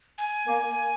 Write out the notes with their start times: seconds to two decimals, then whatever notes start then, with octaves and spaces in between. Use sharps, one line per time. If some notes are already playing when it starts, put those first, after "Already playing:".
0.18 G#5
0.47 A#3